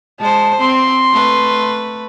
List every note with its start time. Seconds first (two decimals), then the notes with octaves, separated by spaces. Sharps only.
0.20 G#3 C5 A5
0.60 C4 C6
1.12 A3 B4